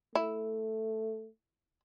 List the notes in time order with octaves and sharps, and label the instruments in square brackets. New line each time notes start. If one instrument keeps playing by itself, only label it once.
[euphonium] A3 [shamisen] E4